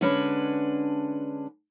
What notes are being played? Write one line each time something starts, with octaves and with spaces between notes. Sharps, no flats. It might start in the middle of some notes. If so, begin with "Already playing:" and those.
D3 G#3 C#4 D4 B4